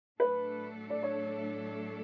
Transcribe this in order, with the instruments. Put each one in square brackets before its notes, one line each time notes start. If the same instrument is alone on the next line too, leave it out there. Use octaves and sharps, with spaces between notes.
[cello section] A2 F#3 A3 D4 A4 [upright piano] B4
[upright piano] D5
C#5